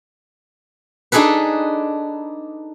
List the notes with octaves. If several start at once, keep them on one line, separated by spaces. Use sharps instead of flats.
D4 D#4 G#4 A4 B4